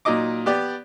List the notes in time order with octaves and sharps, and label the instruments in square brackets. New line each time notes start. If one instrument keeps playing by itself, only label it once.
[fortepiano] A#2 F#3 D#4 D#5 D6
B3 G4 D5